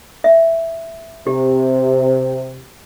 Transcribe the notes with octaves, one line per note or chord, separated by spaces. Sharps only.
E5
C3 G4